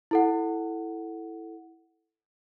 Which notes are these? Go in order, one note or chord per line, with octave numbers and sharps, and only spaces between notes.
E4 A4 F#5